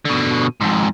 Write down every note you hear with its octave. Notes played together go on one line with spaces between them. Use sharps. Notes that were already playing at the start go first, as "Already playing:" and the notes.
B2 D3
F2 G#2